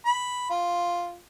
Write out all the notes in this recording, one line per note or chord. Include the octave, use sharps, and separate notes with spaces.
B5
F4